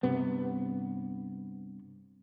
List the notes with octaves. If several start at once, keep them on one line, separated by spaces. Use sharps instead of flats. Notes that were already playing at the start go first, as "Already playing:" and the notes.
G2 C3 B3